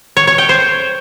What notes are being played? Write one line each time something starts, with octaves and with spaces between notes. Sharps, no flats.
C#5
C#5
G5
C5